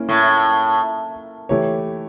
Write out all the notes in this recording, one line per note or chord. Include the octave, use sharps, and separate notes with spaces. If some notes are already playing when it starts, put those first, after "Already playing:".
Already playing: A#3 C#4 E4
A2
E3 A3 E4 G4 C#5